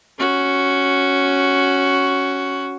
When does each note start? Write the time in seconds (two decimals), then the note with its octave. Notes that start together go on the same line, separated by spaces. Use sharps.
0.19 C#4 F#4